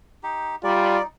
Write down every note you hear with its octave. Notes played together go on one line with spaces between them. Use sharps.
D#4 G4
G3 D#4 F4 D5